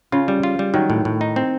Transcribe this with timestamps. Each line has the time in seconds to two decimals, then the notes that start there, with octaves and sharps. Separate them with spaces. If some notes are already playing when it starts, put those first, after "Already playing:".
0.12 C#3 F4
0.28 G3
0.43 F4
0.59 G3
0.74 D#3 F#3
0.90 A2
1.05 A2
1.21 D#4
1.36 C4